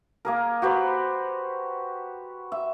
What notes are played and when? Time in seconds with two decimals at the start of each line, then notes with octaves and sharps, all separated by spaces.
0.25 A#3 G#4 A#4
0.62 F#4 G4 B4 C5
2.52 E5